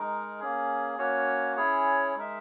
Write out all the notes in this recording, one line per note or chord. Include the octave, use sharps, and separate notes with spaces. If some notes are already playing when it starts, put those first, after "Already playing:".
Already playing: G#3 D#4 A#4
A#3 C#4 G#4
A#3 C#4 F#4 C#5
C#4 E4 G#4 C#5
G#3 D#4 A#4 E5